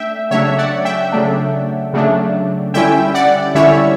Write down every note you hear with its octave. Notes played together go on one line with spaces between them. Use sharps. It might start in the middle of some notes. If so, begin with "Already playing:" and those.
Already playing: A3 D4 E5 G5
C#3 F#3 A3 D4 C#5 E5
D5 F#5
E5 G5
C#3 F#3 A3 D4
C#3 F#3 A3 D4
D3 G3 C#4 E4 E5 G5
D5 F#5
D3 G3 C#4 E4 C#5 E5